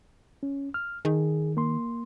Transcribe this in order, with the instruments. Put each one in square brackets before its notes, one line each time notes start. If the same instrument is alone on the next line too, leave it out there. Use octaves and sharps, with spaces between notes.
[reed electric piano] C#4
F6
[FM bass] D#3 [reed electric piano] G#4
[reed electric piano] A#3 C6